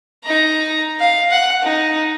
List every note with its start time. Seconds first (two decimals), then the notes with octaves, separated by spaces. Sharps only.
0.24 D#4 A#5
1.00 F5
1.30 F#5
1.63 D#4